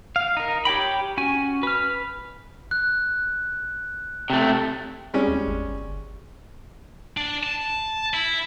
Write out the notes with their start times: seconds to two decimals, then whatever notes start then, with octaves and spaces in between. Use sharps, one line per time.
0.16 F5
0.37 D#4 A#4
0.65 G4 C#5 G5 B5
1.17 C#4 F#4 G#5
1.63 B4 F6
2.71 F#6
4.30 C3 A3
5.14 G3 G#3 C#4
5.28 D#2
5.47 G1
7.17 D4
7.43 A5
8.14 E4